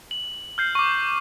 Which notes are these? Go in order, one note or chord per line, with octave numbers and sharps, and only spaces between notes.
F#7
F6 G6 C7
C#6 D6